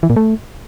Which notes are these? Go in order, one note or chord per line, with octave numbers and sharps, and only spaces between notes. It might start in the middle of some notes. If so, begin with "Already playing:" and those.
E3
A#2
A3